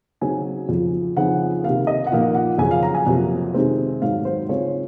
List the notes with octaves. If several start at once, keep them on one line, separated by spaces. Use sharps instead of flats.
C#3 F#3 C4 D#4 G#5
F2 C#3 F3
C#3 F3 C4 D#4 F#5
C3 D#3 A#3 F5
D#5
F#5
A#2 F3 A#3 D#4 F5
F#5
F2 C#3 F#3 G#5
F5
A#5
G#5
F2 C3 F#3 A#3
C3 D#3 G#3 C4
G#2 D#3 F#3 F5
C5
C#3 G#3 C4 F4 C#5